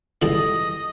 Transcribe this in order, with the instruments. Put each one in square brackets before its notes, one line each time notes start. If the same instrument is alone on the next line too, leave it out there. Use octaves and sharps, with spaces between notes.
[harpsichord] D3 G3 B3 E4 G#4 [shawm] D#5
[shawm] D#5